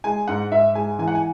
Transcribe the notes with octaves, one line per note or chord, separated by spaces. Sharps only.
G#3 G#5
G#2 F#5
G#2 E5
G#3 G#5
E3 G#5
F#5
G#5